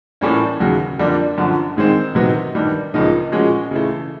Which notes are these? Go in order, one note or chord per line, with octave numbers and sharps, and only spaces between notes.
A2 E3 G3 A#3 C#4
D#2 C#3 F#3
F2 D3 G3 A#3 D4
F#2 D3 F3
G#2 D#3 G#3 C4
C3 D#3 F#3 B3 D#4
G2 D#3 G3
C#2 C#3 F3 A#3 D#4
A#2 F3 G#3 C#4 F#4
C#3 E3 A3